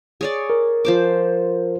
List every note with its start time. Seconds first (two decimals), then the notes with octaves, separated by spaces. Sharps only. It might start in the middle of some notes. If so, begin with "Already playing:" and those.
0.21 G#4 C#5 D5
0.50 A#4
0.85 F3 C5 D6